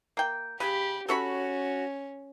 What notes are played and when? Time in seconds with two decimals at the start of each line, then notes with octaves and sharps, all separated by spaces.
0.17 A#3 G5
0.60 C#3 G4 B5
1.08 C#4 F#4 A4 C#5 B5